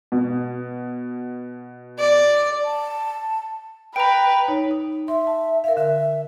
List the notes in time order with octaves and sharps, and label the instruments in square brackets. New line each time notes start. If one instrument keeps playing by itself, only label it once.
[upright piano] B2
[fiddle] D5
[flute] A5
[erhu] B4 [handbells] G5 A#5
[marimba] D#4 C#5
D#6
[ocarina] E5 [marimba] C6
[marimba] A5
[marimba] A#4 F5 [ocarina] E5
[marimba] D3 [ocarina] E5